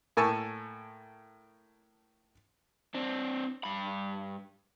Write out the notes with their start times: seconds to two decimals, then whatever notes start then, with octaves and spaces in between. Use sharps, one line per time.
0.17 A2 A#3 G#5 A5 C#6 E6
2.94 C4 D4
3.64 G2 B5